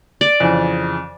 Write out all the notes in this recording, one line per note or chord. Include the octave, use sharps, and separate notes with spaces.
D5
F2 C#3 E3